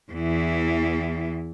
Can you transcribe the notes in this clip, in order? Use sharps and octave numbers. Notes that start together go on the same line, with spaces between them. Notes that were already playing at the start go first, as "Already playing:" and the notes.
E2 E3